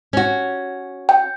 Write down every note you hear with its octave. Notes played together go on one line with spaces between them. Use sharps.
C#4 F#4
G5